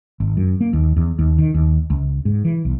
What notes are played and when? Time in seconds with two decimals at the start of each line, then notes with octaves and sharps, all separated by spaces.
0.20 G#1
0.37 F#2
0.61 A#3
0.73 D#2
0.97 E2
1.19 D#2
1.38 D#3
1.54 D#2
1.90 C#2
2.25 G#2
2.45 E3
2.65 B1